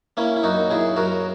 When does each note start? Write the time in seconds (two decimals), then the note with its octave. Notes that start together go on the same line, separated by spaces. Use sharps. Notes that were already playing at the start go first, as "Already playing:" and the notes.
0.17 A#3 C#4 E4
0.36 E4
0.43 F#2 D#4 F#4
0.70 C#3 E4 G#4
0.96 F#2 F#4 A#4